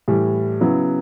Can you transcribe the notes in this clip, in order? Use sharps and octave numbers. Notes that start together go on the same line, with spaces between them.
A2 E3 G3
C#3 F#3 B3 E4